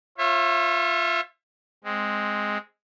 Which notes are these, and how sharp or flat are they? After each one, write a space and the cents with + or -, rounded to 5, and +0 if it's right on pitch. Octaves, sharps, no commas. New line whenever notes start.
F4 +0 C#5 -40 E5 +20
G#3 +0 C4 +0